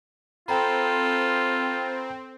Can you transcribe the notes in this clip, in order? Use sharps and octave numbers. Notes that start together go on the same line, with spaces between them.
C4 F4 A4 G5 A#5 B5